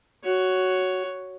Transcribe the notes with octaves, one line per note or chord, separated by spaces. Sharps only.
F#4 C#5